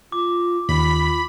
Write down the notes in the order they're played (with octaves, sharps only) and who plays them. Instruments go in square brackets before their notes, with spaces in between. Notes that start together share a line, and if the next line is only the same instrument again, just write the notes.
[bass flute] F4 [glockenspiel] D6
[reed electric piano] D#2 [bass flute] F4 [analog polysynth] B5